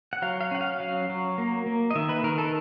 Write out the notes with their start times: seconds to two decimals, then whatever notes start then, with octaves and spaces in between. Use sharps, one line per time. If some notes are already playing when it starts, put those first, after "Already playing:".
0.13 F#5
0.22 F#3 F5
0.41 F5
0.51 C#4 F#5
0.61 F5
0.80 F#3 F5
1.09 F#3
1.38 A#3
1.66 A#3
1.91 D#5
1.95 D#3 E5
2.09 B4
2.24 D#3 A#4
2.38 A4